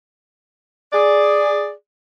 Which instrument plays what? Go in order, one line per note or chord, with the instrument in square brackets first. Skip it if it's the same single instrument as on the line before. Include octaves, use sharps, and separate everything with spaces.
[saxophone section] G#4 D5